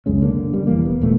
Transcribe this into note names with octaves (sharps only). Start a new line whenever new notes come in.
C#2 F#2 G#3 C#4
D3 A#3
C#3 G3
F1 E2 E3 A#3
D#1 B3
E1 D2 A#2 A3